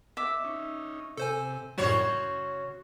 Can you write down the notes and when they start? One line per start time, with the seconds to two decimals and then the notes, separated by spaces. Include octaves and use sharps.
0.17 E5 D6
0.44 C#4 D#4
1.17 C3 A4 C5 G#5
1.78 F#2 A2 C#3 G3 F#4 C5 C#5